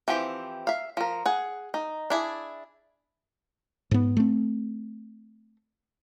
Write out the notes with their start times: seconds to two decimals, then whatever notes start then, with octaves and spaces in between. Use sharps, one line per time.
0.08 E3 F3 C4 G4
0.67 E5 F5
0.97 F3 A#4
1.26 G#4 F#5
1.74 D#4
2.10 D4 E4 G#4
3.91 G#2 B3
4.17 A3 C4